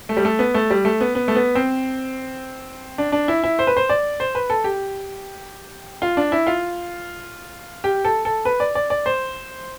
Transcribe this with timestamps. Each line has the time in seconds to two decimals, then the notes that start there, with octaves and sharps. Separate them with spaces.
0.09 A3
0.17 G3
0.25 A3
0.39 B3
0.54 A3
0.70 G3
0.85 A3
1.01 B3
1.15 B3
1.28 A3
1.35 B3
1.55 C4
2.98 D4
3.12 D4
3.28 E4
3.44 E4
3.59 C5
3.67 B4
3.77 C5
3.90 D5
4.20 C5
4.35 B4
4.50 A4
4.64 G4
6.02 F4
6.17 D4
6.32 E4
6.47 F4
7.84 G4
8.05 A4
8.25 A4
8.45 B4
8.60 D5
8.75 D5
8.90 D5
9.06 C5